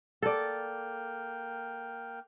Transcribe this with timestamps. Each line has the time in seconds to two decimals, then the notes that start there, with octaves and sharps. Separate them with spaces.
0.22 A#3 A4 D5 G5 F6